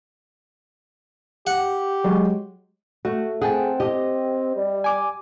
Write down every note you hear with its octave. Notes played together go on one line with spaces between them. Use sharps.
G4 F#5
F#3 G#3
A3 F#4
C4 G#4 F#5 G5 A5
G4 D#5
G3
G#5 D6